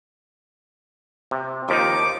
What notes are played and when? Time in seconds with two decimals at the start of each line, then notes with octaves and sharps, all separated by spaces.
1.31 C3
1.69 D#2 F3 D#4 D6